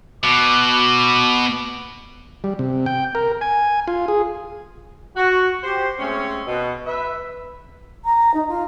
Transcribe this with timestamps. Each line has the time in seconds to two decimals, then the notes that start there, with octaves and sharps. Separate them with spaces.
0.23 B2 D6
2.44 G3
2.59 C3
2.86 G5
3.15 A#4
3.41 G#5
3.88 F4
4.08 G#4
5.16 F#4
5.62 G4 C5
5.98 G#3 A3 C4 C#4
6.46 B2
6.86 B4 E5
8.04 A#5
8.34 D#4
8.48 F4